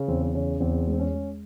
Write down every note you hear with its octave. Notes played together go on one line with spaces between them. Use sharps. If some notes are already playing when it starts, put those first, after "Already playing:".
Already playing: C#3
E2 C4
C4
C#3 C#4
E2 C4
G#3
C4
C#4
G#3